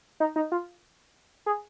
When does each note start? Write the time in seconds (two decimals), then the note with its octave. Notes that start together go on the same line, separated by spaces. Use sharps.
0.20 D#4
0.36 D#4
0.52 F4
1.46 G#4